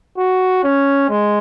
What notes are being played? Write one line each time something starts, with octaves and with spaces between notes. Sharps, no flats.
F#4
C#4
G#3